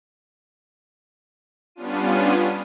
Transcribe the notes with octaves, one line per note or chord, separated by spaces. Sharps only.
G3 B3 C#4 D4 F4 D#7